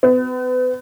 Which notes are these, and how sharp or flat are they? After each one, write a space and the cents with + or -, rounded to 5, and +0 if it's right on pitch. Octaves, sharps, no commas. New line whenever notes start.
B3 +40